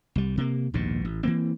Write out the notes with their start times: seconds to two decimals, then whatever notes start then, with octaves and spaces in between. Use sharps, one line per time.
0.16 C2 G3
0.37 C3 A#3
0.74 A#1 D#2 G#2 B2
1.05 A1
1.23 E3 A#3 C4